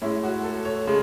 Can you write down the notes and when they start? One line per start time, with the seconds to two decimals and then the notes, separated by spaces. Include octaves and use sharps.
0.02 A2 G#3 C#4 E4
0.23 F#4
0.43 A4
0.65 C#5
0.87 C#3 G#3